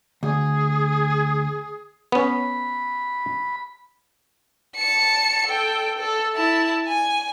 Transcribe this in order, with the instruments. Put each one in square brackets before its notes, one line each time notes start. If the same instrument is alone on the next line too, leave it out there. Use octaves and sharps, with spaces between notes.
[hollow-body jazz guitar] D2 [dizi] G#4
[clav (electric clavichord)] B3 C#4 [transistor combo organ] B5
[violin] A5 C#7
A4 G5
A4
E4 A5
G#5